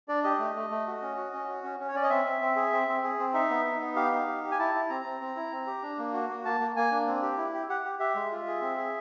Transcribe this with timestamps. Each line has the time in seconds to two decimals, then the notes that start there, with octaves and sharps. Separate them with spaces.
0.09 D4 D5
0.23 G4 D#5
0.39 A3
0.56 A3
0.70 A3
0.87 F#4
1.02 C#4
1.17 F#4
1.33 C#4
1.48 F#4
1.64 C#4
1.80 C#4
1.88 C#5
1.95 C#4 D5
2.03 D#5
2.10 C4 E5
2.25 C4
2.42 C4
2.56 G#4
2.72 C4
2.88 C4
3.03 G#4
3.19 C4
3.34 D#4 E5
3.50 B3
3.66 D#4
3.80 B3
3.96 G4 F5
4.12 D#4
4.27 G4
4.43 G4
4.51 G#5
4.59 E4 A5
4.74 E4
4.89 C4 A#5
5.05 C4
5.21 C4
5.36 E4
5.52 C4
5.67 G4
5.82 D4
5.98 A#3
6.13 F#4
6.29 A#3
6.45 A#3 A5
6.60 A#3
6.76 A#3 G#5
6.91 D4
7.07 C4
7.22 G4
7.37 E4
7.54 G4
7.69 G4 F#5
7.85 G4
7.99 G4 E5
8.15 G#3
8.31 F4
8.47 G#4
8.61 C4
8.77 G#4